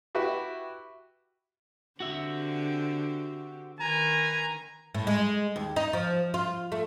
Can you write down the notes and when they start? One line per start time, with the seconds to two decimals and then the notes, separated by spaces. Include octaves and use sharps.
0.15 E4 F#4 G4 B4 E5
2.00 D3 C4 F#4 G4 E5
3.80 D#3 B4 G#5 A#5
4.94 A2
5.07 G#3
5.56 D#2
5.76 D#4
5.93 F3
6.34 F4
6.72 A3